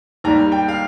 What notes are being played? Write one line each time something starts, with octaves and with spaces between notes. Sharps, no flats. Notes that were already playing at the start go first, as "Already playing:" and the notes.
D#2 D#3 G3 A#5
G5
F5